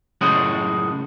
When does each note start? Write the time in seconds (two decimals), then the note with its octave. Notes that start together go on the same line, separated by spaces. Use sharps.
0.21 C#2 F#2 A2 G#3